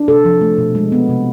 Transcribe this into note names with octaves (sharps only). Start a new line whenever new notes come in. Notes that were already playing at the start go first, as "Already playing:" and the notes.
Already playing: D4
C3 A4
F3
A3
B2
G#3
B3
C3